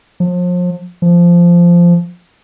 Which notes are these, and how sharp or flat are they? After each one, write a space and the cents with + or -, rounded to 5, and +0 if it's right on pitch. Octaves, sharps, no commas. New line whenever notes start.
F3 +35
F3 -10